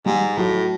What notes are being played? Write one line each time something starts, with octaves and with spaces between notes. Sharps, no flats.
G#2 G3 G4
A2 F#3 F#4